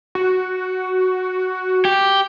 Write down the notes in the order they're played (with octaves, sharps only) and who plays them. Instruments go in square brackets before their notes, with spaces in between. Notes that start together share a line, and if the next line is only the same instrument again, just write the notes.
[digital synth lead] F#4
[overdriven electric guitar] G4